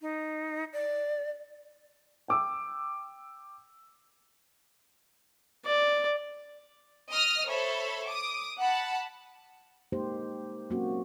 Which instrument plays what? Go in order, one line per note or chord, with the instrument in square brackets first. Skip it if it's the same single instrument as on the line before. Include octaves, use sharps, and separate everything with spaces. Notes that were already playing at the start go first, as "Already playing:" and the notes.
[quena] D#4
D5
[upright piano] G5 D6 E6
[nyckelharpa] D5
[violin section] D#5 D#6 F6
A4 C5 C#5 E5 B5
D6 D#6
F#5 A5 B5
[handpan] G#3 A#3 D#4 G4 C5
F#3 A#3 C4 C#4 F#4